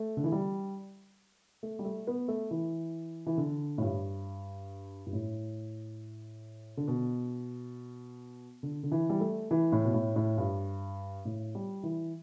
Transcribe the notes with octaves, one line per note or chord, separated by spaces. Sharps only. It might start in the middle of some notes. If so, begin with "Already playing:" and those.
Already playing: A3
D3
E3
G3
A3
G3
A3
B3
A3
E3
E3
D3
A2
G2
G2
A2
D3
B2
D3
D3
E3
G3
A3
E3
A2
B2
A2
A2
G2
A2
G3
E3